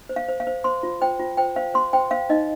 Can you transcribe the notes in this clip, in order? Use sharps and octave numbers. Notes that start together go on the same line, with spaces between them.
C5
F5
C5
F5
C5
C5 C6
F4
C5 G5
F4
C5 G5
C5 F5
C5 C6
C5 G5
C5 F5
D#4 D#5